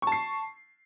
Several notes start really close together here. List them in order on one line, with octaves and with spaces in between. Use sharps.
C#6 A5 C7